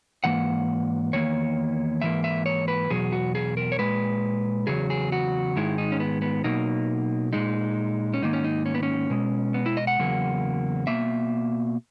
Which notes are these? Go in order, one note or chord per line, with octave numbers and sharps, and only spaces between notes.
G#2 E3 A#3 F#5
E2 D#3 A#3 C#5
G#2 E3 A#3 E5
E5
C#5
B4
E2 B2 F#3 G#4
F#4
G#4
A#4
C#5
A#2 G#3 B4
E2 C#3 F#3 G#4
G#4
F#4
G#2 D#3 G#3 E4
D#4
C#4
B3
B3
B2 F#3 A#3 D#4
A#2 G#3 D#4
C#4
G#2 D#3 A#3 D#4
C#4
D#4
C#4
B3
C#4
B2 G#3
B3
E4
D#5
F#5
E2 C#3 F#3 A#3
B2 A#3 E5